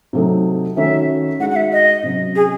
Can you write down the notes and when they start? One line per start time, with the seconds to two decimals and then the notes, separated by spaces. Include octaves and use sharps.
0.13 C3 F#3 A3 D#4
0.77 D#3 A3 C#4 F#4 E5
1.40 G#3 D#4 F#4 F#5
1.51 F#5
1.56 E5
1.72 D#5
2.03 C3 F#3 C#4
2.35 G#4